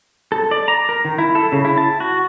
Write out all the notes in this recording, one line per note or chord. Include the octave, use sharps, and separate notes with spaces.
A4
D5
A#5
A#4
D#3
E4
A4
C#3
E4
A5
F#4